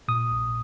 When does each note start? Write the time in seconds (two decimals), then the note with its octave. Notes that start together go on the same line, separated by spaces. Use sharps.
0.08 A#2 D#6
0.31 A#1